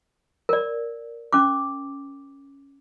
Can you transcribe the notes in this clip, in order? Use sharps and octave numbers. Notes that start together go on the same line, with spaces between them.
A#4 D5
C#4 D6